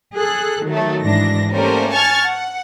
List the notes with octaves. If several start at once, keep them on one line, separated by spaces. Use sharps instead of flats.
G#4 A4 F#6
D#3 F#3 A3
G#2 E3 D4 A#6
G3 A3 A#3 C#4 A#4 C5
G#5 A5 C#6 F6 G#6 A6
F#5